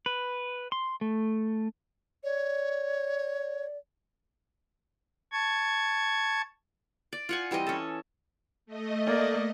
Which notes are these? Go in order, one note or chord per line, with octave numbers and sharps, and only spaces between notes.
B4
C6
A3
C#5 D5
A5 C#6 G#6
D5
F4 F#5 G#5
E3 G3 C4 D#5
C#4 A4
A3 D#5
A#3 D5